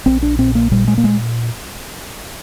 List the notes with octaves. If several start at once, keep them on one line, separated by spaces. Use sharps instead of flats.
A#1 C4
D4
A#2 C4
A#3
A#2 G3
G#3
A#3
G#3